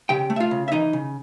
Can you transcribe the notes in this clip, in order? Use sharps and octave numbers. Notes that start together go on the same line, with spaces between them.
C#3 G4 G5
A3
E5
F4 F5
C#3
E5
E3 D#4 D#5
C#3